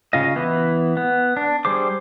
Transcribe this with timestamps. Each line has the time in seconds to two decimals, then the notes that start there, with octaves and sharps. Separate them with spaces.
0.13 C#3 F4 D#5
0.36 E3 B3 E4
0.97 B3
1.37 D4
1.65 G3 G#4 C5 D6